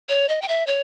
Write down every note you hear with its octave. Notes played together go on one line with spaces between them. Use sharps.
C#5
D#5
G5
E5
C#5